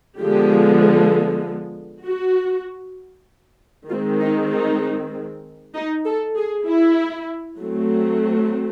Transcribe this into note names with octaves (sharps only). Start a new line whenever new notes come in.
D3 F3 G#3 B3 G4
F#4
D#3 G#3 C4 F4
D#4
D#4
D#4
A4
G#4
E4
F#3 A3 C4